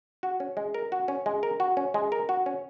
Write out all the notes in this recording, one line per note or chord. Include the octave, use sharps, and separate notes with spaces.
F#4
C#4
G#3
A#4
F#4
C#4
G#3
A#4
F#4
C#4
G#3
A#4
F#4
C#4